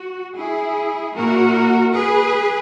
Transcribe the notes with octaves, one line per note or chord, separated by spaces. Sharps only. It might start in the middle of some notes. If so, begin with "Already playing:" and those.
Already playing: F#4
E4 G#4
A#2 A#3 E4 F#4 A#4
G#4 B4